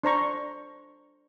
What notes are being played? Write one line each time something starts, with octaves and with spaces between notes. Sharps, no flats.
D4 C5 A#5 C#6